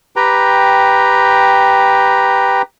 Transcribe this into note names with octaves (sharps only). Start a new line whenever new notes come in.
G4 B4 G5 A#5